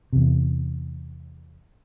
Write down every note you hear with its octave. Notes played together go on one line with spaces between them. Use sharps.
E2 C3